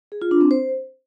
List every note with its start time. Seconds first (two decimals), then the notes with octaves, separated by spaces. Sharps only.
0.12 G#4
0.22 F4
0.31 D4
0.41 C4
0.51 C5